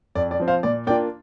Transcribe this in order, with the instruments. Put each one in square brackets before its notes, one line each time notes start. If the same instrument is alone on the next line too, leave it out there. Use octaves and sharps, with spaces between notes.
[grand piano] F2 [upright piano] D5
[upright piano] D5
[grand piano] F3 C4
[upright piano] C5 F5
[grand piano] A#2 [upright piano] D5
[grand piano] A#3 D4 F4 [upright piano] D5 G5